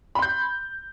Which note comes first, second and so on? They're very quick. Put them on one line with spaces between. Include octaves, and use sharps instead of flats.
B5 C6 G6